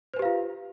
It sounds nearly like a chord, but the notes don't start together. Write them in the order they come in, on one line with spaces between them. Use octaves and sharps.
C5 B4 G4 F5 F4